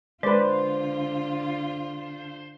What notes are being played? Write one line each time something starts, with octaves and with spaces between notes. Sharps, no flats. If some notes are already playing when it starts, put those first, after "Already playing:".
D3 G#3 F4 B4 C5 D5